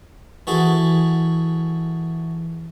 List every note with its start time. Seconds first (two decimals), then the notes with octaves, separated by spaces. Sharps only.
0.47 E3 F#4 G#4 A4